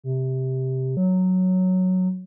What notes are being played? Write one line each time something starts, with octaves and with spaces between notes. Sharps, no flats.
C3
F#3